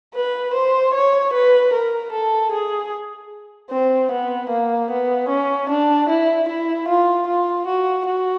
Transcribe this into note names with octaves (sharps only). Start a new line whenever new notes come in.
B4
C5
C#5
B4
A#4
A4
G#4
C4
B3
A#3
B3
C#4
D4
E4
E4
F4
F4
F#4
F#4